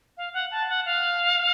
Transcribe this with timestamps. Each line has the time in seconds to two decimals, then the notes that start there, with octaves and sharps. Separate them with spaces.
0.17 F5
0.33 F#5
0.51 A5
0.69 F#5
0.85 F5